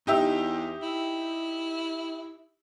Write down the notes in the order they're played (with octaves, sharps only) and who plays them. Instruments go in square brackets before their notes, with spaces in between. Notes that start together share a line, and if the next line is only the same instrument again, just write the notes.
[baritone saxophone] E2 [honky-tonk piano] D#4 G4 E5
[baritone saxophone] E4